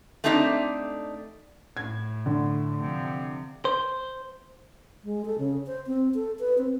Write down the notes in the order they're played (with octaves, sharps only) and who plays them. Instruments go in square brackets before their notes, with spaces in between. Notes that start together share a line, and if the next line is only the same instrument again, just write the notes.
[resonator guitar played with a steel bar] A3 C4 D4 D#4 F#4 G4
[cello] A2 [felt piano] G#6
[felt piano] D3
[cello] C3 F3
[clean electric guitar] C5
[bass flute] G#3
A4
C#3
C5
C4
A4
B4
C4